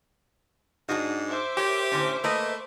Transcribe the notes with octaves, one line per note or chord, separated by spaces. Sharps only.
G#2 D4 F#4 D#5
C5 E5 D6
G4 A#4 C#5 G5
A2 D3 C#4
A3 A#3 B4 D#5